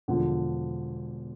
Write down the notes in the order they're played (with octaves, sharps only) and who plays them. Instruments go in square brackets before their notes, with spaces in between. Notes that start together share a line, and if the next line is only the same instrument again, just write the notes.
[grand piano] E1 E2 D3 F3